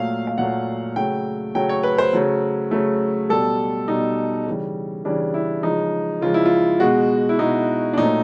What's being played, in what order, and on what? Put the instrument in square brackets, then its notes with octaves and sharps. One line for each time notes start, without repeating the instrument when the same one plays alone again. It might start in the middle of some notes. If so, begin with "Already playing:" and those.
Already playing: [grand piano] A#2 F#3 A3 F5
F5
A#2 F#3 A3 F#5
C#3 F#3 A3 G5
C#3 F#3 A3 G5
C#5
B4
C5
C#3 F#3 A3
C#3 F#3 A3
B2 G3 A4
B2 G3 D#4
C#3 E3 G3
C#3 E3 G3 D4
E4
C#3 F3 G#3 D#4
C#3 F3 G#3 F4
E4
F4
B2 G#3 F#4
E4
B2 G#3 D#4
D4
A#2 F#3 A3 D#4